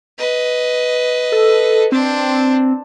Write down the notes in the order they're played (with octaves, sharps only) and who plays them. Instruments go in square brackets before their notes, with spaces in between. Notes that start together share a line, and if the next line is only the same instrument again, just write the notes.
[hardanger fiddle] B4 D#5
[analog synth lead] A4
[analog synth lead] C4 [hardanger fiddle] D4 C5